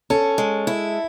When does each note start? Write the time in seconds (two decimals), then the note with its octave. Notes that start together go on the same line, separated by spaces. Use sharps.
0.10 C#4 A4
0.38 G#3
0.67 E4